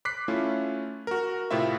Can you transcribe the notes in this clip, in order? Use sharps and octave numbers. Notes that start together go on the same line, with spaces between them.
D6 F#6 B6 C7
A3 C#4 E4 F4
F#4 A#4
A2 C3 C4 E4 F4 E5